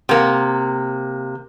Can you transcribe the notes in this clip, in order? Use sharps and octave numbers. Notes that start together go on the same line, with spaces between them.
C3 A#3